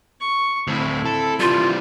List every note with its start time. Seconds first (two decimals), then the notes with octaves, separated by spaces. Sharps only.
0.20 C#6
0.67 D2 A2 C4 E4
1.05 A4
1.40 E3 G3 F4